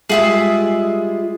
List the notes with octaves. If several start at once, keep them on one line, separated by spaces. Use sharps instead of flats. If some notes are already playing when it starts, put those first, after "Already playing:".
G3 G#3 F4 G#4 E5 E6